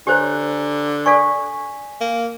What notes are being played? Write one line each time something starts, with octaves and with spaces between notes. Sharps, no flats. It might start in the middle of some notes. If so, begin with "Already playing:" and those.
D3 G4 C5 C#5 G#5 A#5
A4 D5 G#5 C#6 B6
A#3